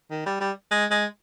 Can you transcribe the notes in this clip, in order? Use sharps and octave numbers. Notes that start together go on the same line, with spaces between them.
D#3
G3
G3
G#3
G#3